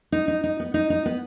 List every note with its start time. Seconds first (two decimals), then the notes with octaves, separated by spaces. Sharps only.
0.12 D#4
0.28 D#4
0.44 D#4
0.60 B3
0.74 D#4
0.90 D#4
1.06 B3